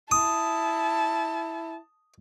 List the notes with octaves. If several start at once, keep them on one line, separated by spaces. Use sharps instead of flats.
E4 A5 D#6